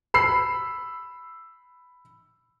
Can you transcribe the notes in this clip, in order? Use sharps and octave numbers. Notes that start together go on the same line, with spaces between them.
B5 E6 C7